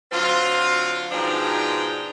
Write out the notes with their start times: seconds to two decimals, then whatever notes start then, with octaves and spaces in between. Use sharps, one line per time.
0.12 D3 F#3 C4 F4
1.12 G#2 B2 F3 D4 G5 A#5